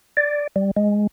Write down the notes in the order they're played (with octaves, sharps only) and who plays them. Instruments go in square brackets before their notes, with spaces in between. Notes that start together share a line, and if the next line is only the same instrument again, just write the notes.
[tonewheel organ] D5
G3
G#3